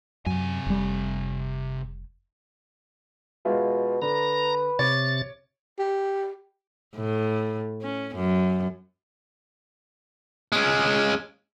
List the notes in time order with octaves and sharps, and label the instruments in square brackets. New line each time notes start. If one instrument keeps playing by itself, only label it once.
[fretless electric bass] F#2 [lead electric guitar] C3 G#5
[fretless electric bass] F1 G3
[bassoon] B2 [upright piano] G#3 F4 E5
[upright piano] D3 [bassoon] B4 [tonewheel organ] A#5
[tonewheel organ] C3 A6 [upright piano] C#5 D6
[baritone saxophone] G4
[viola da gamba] A2
C#4
F#2
[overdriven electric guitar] G#3 C#4